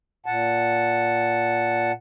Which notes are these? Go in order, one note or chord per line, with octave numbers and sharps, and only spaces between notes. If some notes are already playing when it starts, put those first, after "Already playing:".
A#2 F#5 A5